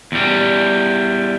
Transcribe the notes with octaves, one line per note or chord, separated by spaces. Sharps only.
E2 G3